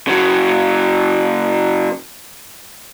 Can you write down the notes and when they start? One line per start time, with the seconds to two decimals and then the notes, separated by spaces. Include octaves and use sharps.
0.07 C#3 F#3